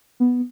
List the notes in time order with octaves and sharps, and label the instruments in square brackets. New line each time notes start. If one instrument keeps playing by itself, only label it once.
[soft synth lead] B3